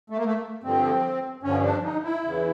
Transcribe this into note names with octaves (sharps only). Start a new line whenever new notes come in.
A3
A#3
A3
G2 D3 F3 C4
G2 D3 F3 C#4
D4
D#4
E4
E2 C#3 E3